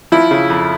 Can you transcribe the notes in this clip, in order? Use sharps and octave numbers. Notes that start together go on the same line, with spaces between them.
F3 E4
C#3
F2